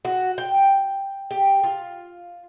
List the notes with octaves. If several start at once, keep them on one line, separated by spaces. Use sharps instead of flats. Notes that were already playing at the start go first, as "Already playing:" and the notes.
F#4
G5
G4
F4